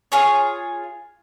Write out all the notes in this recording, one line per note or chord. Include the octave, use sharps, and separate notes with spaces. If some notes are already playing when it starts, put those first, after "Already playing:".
F4 G#4 C#5